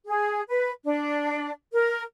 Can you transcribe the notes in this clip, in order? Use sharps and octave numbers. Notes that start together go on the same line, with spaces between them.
G#4
B4
D4
A#4